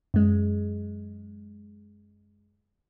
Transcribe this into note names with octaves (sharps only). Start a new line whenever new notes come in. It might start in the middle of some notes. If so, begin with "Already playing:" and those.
F#2 G#3